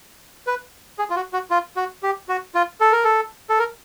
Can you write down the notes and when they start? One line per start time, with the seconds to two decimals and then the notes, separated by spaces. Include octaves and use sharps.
0.47 B4
0.99 G#4
1.10 F4
1.16 F#4
1.33 F#4
1.51 F4
1.77 F#4
2.03 G4
2.29 F#4
2.55 F4
2.80 A4
2.92 A#4
3.04 A4
3.49 A4
3.59 A#4